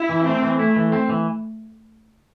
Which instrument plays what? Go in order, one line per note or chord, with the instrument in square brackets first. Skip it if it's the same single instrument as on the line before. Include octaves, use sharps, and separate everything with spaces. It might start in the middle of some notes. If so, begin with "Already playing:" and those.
Already playing: [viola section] E4
[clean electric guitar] E3
[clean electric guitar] A3 [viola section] C4
[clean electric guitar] E3
[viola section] A3 [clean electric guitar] E4
[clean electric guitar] E3
C4
E3